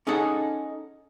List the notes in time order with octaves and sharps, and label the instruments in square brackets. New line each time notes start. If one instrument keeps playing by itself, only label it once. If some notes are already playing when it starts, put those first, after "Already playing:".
[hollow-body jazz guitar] C#4 D#4 G#4 A4 F#5